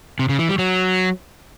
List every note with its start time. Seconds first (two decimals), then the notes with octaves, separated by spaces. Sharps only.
0.19 C3
0.29 C#3
0.39 E3
0.49 G3
0.59 F#3